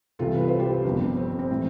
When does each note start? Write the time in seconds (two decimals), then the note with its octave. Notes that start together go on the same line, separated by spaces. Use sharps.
0.19 C2 C3 E3 F4 A4
0.35 B4
0.48 C5
0.60 G4 B4
0.85 G1 F2 D3
1.17 C4
1.39 C4
1.50 A2 E3